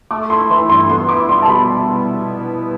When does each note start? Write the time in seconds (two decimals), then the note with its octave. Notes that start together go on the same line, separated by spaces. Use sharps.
0.11 A3 D6
0.30 E4 C6
0.50 E3 C6
0.69 G2 C6
0.89 B3 C6
1.09 E4 D6
1.28 G3 C6
1.42 A5
1.48 B2 B5